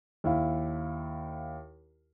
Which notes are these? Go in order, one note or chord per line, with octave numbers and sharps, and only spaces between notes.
D#2 E4 F5